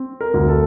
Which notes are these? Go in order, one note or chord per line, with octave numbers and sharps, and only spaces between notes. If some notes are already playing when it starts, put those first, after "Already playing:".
Already playing: C4
A#4
D2
A4